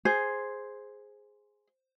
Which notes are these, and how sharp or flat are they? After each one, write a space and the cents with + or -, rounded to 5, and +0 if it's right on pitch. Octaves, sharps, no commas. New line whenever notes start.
G#4 +0 C5 +0